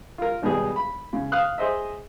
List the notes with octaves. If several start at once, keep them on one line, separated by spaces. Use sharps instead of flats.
F4 A#4
G#1 B2 G3 G#4
B5
C#3
F5 D#6 F#6
G#4 C5 D#5 E5